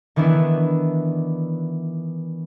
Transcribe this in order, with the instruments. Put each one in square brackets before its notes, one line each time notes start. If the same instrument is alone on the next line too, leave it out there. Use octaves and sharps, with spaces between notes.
[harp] D#3 E3 B3 D4 E4